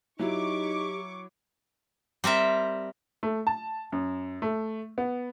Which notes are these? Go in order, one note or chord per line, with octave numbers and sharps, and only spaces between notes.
F#3 D#4 E4 G4 C#6 D6
G3 C4 A#4 E5
A3
A5
F#2
A3
B3